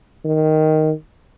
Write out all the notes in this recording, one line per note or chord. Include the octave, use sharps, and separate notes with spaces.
D#3